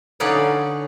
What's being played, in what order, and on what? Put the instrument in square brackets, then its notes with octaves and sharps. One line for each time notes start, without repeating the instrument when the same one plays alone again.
[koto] D3 C#4 D#4 B4 D5 F5